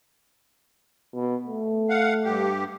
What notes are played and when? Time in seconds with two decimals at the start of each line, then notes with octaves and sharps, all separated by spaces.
1.15 B2
1.47 A3
1.89 F5 F#5
2.24 G2 G4